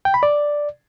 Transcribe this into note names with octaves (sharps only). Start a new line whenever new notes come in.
G5
B5
D5